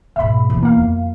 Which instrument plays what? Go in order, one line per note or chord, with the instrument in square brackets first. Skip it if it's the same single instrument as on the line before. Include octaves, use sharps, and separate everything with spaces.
[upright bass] G#2 B2 [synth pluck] E5 B5
[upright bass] E2 B3
[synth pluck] A#3 F5
[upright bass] F2